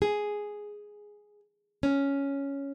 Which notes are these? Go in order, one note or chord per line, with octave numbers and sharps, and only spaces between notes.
G#4
C#4